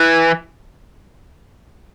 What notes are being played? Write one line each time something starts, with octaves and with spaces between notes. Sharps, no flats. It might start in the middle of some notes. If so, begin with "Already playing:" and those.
Already playing: E3